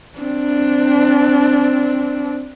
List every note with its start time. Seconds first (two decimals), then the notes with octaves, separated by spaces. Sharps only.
0.19 C4 D4